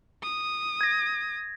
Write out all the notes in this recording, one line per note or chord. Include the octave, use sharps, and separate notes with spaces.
D#6
G#6 A#6